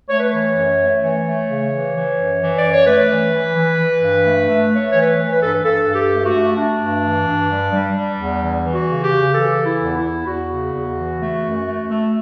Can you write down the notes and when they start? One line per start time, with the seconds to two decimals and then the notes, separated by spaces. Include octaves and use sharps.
0.08 A3 C#5
0.19 B4
0.30 E3 C#5
0.54 F#2
0.78 A3
1.01 E3 C#5
1.24 A3
1.48 C#3
1.70 E3
1.94 E3
2.16 F#2
2.40 E3
2.58 F#2 D5
2.72 C#5
2.86 A3 B4
3.09 E3
3.32 E3
3.56 E3
3.79 E3
4.01 G2
4.25 A3
4.48 A3
4.71 A3 C#5
4.92 E3 C#5
5.02 B4
5.17 E3
5.33 B4
5.41 G2 A4
5.53 B4
5.63 G2 A4
5.87 G2
5.94 G4
6.10 A3
6.25 F#4
6.33 A3
6.56 A3 D4
6.79 G2
7.03 E3
7.25 G2
7.49 G3
7.72 G3
7.95 G3
8.18 E2
8.41 E3
8.64 E3
8.72 F#4
8.87 C#3
9.03 G4
9.10 C#3
9.34 E3 A4
9.57 E3
9.65 E4
9.80 E2
9.96 E4
10.03 E2
10.26 E2 F#4
10.49 C#3
10.73 E2
10.96 E3
11.18 A3
11.42 F#2
11.65 A3
11.89 A3